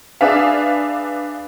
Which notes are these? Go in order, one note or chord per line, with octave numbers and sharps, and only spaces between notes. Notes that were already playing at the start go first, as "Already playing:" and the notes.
D4 G#4 B4 E5 F5